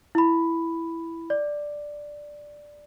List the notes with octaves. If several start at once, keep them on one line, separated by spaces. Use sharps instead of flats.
E4 B5
D5